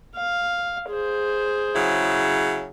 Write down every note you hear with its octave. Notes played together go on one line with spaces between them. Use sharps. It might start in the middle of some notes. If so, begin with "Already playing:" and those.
F5
G#4 C5
C#3 F#3 E4